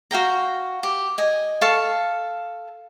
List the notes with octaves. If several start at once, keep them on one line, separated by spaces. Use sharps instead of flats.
F#4 F5 G5 A#5
G4
D#5 G#5
A4 F5 A5 C#6